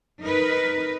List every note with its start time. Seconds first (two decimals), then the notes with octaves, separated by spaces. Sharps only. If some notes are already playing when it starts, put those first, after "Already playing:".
0.22 D#4 A#4 B4